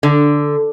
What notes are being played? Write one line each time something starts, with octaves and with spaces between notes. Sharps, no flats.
D3